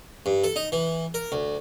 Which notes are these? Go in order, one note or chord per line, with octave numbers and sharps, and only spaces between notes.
G2
A4
D#4
E3
A#4
D2